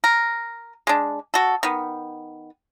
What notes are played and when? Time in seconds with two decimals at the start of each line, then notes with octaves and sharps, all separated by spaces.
0.04 A#4
0.87 G#3 D4
1.34 F#4 A4
1.63 D#3 B3